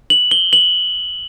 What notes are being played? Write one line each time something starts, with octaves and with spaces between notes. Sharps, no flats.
F#7
G7
F#7